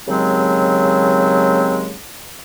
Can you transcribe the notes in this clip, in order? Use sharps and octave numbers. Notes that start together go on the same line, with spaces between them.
D#2 C#3 F#3 G#3 C4